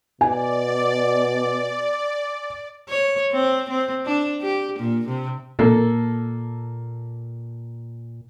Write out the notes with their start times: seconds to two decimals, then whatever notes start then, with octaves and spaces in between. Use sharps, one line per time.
0.21 B2 D5 G#5
2.89 C#5
3.32 C4
3.69 C4
4.06 D4
4.42 G4
4.79 A#2
5.08 C3
5.59 A#2 A#3 A4